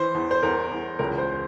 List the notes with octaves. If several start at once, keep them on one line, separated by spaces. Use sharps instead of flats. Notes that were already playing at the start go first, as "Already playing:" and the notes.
Already playing: E3 C5
E2
C5
E2 A#4
E2
C#2 A#4
C5